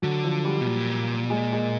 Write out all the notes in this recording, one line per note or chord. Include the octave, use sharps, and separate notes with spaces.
D3 F#3
F3
G3
B2
A#2
G#3
G#3